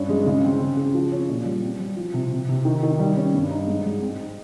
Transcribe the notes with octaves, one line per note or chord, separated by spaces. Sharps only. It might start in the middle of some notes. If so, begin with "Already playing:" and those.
Already playing: G2 C#4
G#3
C#3
C4
C#3
C#3
F3
C#4
A#2
G3
C4
G3
F3
C3
C3
C3
D#3
D#3
G3
C#4
G2
D#4
G#2
G#3
C4
D#4